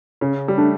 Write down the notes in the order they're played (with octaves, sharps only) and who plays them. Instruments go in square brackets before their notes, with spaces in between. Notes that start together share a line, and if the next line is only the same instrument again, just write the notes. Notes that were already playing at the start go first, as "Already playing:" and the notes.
[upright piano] C#3 [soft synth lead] C#4
[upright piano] G3
[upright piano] A3 [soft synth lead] D4